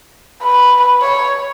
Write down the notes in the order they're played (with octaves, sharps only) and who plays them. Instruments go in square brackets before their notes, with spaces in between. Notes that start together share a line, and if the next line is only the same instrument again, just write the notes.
[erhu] B4
C#5